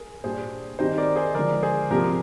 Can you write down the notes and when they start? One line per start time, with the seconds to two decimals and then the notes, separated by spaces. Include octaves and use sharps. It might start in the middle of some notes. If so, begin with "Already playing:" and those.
Already playing: G#4 A#4
0.24 A#2 G3 D4 G#4 C5
0.79 D#3 G3 C4 D#4 G4 C5 D#5
0.98 A#4 D5
1.16 G#4 C5
1.34 D3 F3 G#3 A#4 D5
1.63 G#4 C5
1.90 C3 F3 A#3 D4 G4 A#4